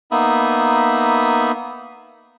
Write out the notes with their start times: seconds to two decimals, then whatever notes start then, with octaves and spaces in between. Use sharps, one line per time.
0.11 A#3 B3 D#4 E5 B5 D#6